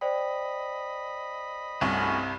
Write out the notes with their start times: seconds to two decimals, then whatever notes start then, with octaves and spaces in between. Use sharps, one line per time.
0.01 C5 D5 D#5 G5 B5
1.81 C2 G2 A3 C#4 F#4